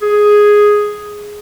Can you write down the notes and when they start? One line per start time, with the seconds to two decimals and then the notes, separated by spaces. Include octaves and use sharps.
0.02 G#4